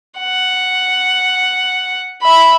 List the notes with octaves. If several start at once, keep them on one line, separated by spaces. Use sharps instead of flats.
F#5
E5 B5